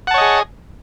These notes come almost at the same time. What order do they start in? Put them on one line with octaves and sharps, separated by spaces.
F#5 A5 C#5 D#5 G#4